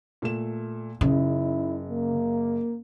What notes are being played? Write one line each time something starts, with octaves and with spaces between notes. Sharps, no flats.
A#2 A3 E7
F#1 C#3 D#4 E4
A#3